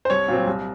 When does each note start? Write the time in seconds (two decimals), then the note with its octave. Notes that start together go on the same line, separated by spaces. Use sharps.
0.05 C5
0.10 C2 C#5
0.28 A#2 F#3 C4
0.47 C2